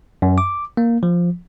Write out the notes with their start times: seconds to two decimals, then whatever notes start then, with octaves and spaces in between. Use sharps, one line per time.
0.22 F#2
0.38 D6
0.77 A#3
1.03 F3